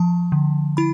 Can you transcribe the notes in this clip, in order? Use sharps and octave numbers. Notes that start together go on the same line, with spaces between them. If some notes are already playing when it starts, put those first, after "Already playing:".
Already playing: F3 A5
D3
E4 B5